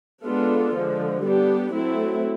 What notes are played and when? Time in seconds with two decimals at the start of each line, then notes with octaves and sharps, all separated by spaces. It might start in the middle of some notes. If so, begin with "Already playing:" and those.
0.23 G#3 B3 D4 F4 A4
0.73 D3 F3 G#3
1.23 G3 B3 D4 G4
1.73 F#3 A3 C4 E4